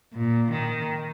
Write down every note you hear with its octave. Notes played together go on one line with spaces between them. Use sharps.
A#2
D#3